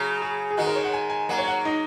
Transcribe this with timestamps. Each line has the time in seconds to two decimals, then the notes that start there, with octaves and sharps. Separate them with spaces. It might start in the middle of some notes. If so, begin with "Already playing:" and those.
Already playing: C#3 F#3
0.22 G#4
0.50 G#4
0.57 D#3 G#3 F#4
0.67 A#4
0.76 C#5
0.84 F#5
0.93 G#5
1.10 G#5
1.29 F#3 A#3 F#5
1.38 C#5
1.47 F#5
1.65 D#4